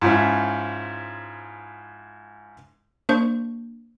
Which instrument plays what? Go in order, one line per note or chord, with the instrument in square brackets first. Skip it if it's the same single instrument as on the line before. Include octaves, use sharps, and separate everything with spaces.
[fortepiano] G#2 F3 C#4 E4
[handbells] A#3 D4 C5 C#6